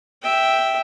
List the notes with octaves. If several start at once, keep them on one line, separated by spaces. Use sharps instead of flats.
E5 G5